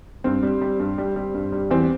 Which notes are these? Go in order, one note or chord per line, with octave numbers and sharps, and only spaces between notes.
G2 C4
G3
G3
G2
G3
G3
G2
G3
E2 C4